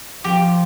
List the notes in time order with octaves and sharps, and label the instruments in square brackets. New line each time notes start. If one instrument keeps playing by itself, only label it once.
[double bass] F3 [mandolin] G4